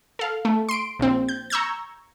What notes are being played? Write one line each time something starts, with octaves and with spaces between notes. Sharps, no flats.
A4 F5
A3
C6 D7
A#1 C4
G6
A#5 C#6 E6 G6 G#6